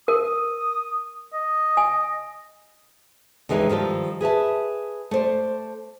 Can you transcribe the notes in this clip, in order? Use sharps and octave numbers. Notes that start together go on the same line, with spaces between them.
A#4 D#6
D#5
G#5
D#2 D3 E3 G#3 C#4 D#4
D#3 F3 G3 A4
G#4 B4 E5 A5
A3 C5 D5